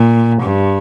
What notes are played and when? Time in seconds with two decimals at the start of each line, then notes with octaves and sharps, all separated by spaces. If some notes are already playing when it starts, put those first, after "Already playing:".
Already playing: A#2
0.42 G2